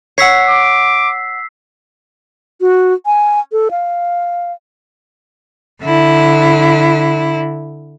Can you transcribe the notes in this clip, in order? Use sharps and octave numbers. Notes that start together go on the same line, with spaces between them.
C#5 F#5 E6 B6 C7
D6
F#4
G#5
A4
F5
D3 E4